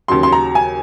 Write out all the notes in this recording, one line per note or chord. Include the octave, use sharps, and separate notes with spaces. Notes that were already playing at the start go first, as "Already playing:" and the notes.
D#2 C#3 F#3 C6
C6
A#5
G#5